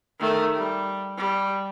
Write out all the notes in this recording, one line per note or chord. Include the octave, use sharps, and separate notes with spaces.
D#3 A3
G3
G3